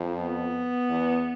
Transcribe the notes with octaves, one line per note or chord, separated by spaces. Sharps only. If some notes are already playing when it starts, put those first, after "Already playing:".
Already playing: F2
B3
E2